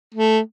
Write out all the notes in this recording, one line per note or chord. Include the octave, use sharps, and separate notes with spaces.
A3